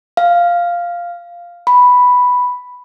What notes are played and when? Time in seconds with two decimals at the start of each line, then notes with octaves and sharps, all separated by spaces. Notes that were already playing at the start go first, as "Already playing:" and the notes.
0.17 F5
1.67 B5